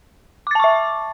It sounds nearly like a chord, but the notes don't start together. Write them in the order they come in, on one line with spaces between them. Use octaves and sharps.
D6 A6 A5 C#6 E5